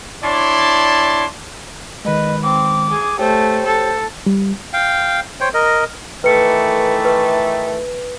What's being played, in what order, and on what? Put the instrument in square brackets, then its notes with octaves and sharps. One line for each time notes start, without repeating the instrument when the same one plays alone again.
[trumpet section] D4 E4 C#5 D5 A5 C6
[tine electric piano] D#3 G#3 [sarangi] B4 [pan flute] D#5
[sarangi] C4 [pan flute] D6
[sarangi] G#4
[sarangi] A3 [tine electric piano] G4 C#5 G5 [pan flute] C5
[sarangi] A4
[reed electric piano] G3
[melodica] F5 G5
C5 C#5 G5
A#4 D#5
[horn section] D#3 E3 A3 [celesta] B4 C#7
[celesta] B4